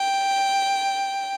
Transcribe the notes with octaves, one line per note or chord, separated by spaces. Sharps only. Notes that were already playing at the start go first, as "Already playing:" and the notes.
Already playing: G5